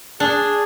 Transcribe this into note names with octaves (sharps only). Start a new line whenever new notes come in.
D4 G#4